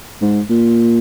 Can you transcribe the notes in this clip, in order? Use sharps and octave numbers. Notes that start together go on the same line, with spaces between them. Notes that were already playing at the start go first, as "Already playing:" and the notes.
G#2
A#2